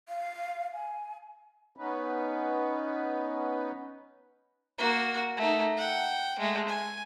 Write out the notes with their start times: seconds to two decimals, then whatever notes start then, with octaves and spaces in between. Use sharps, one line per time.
0.09 F5
0.74 G#5
1.77 B3 C#4 D#4 B4
4.78 A#3 F#4
5.37 A3 D#4
5.77 F#5 G5
6.39 G#3 A3
6.68 G#5